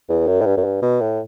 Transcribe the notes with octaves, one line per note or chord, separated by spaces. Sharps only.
E2
F#2
A2
G2
F#2
G2
B2
A2